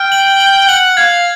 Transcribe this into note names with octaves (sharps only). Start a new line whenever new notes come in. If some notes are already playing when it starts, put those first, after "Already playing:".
Already playing: G5 F6
F#7
F#7
F#5 F#7
F5 G#6